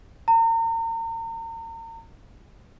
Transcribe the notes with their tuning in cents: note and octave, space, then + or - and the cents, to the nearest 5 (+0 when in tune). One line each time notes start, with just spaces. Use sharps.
A#5 -35